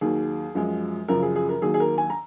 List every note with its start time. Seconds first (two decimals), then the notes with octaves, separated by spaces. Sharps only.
0.01 D#2 D#3 F#3 G#4
0.55 F#2 F3 G#3
1.08 F#2 C#3 F3 A#4
1.23 G#4
1.36 G#4
1.49 A#4
1.62 D#2 D#3 F#3 G#4
1.74 G#4
1.80 A#4
1.98 G#5
2.10 A#5